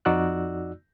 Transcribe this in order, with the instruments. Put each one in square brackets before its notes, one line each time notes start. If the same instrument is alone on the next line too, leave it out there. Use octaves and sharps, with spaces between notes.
[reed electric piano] F2 D#4 F#4 D5 E6 F#6